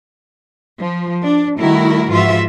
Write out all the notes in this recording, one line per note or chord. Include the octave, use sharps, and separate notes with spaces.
F3
D4
D#3 G3 A3 E4 F#4 A#4
G#2 E3 F3 F4 F#4 E5